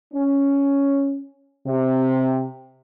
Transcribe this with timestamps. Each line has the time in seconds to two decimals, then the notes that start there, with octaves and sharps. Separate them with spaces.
0.14 C#4
1.67 C3